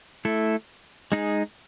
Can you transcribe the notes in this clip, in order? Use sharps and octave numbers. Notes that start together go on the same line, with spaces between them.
A3 E4 A4
G#3 D#4 G#4